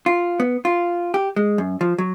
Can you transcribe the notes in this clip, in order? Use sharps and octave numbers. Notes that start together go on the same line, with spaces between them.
F4
B3
F4
G4
G#3
F#2
F3
F#3